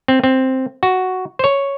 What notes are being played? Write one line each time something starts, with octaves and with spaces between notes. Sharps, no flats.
C4
C4
F#4
C5
C#5